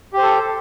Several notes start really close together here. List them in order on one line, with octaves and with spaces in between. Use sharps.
G4 C5 A4